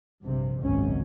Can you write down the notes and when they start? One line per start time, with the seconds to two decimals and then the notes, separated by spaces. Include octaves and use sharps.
0.23 A#1 G2 C3
0.61 G#1 C#2 F#2 B2 C#4